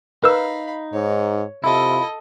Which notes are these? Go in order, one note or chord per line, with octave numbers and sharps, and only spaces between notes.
D#4 A#4 B4 F5 B5 E6
G#2 C#5
C3 E4 F4 A4 D#5